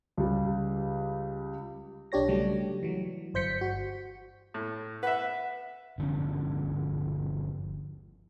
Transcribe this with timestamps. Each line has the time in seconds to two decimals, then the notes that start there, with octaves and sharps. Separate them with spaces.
0.17 C#2 G3
2.12 B1 D4 G4 C#5 A#6
2.28 C#3 F#3 G3 A3
2.83 E3 F#3
3.34 G1 C5 G6 B6 C#7
3.61 F#4
4.54 A2
5.03 B4 E5 F#5
5.98 G1 D3 F3 C#4